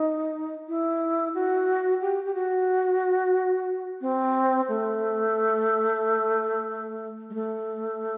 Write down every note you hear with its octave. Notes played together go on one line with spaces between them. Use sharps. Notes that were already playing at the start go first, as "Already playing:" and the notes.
Already playing: D#4
E4
F#4
G4
G4
F#4
C4
A3
G#3
A3